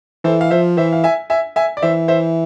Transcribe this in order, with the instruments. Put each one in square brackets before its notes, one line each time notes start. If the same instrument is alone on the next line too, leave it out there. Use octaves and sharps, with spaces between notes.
[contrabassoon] E3 [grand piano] A4 C5
[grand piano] F5
[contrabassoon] F3 [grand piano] C5 E5
[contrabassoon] E3 [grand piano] C5 E5
[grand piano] F5
E5 G#5
E5 G#5
E5 G#5
D5
[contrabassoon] E3 [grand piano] C5 E5
[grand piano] C5 E5